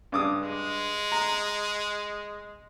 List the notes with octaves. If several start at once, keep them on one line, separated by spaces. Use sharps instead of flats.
G2 D6 D#6
G#3
A#5